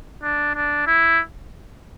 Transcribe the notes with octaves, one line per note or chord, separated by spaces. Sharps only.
D4
D4
E4